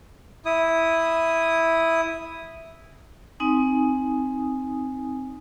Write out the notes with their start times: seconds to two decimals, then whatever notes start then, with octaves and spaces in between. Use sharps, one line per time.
0.46 E4 D#6
3.40 C4 D#4 G#5 D#6